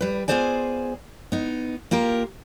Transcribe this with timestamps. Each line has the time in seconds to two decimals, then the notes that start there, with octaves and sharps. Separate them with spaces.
0.01 G3 B4
0.28 B3 F4 G#4 C5 D5 G#5
1.32 B3 D#4
1.91 A#3 F4 G4 A#4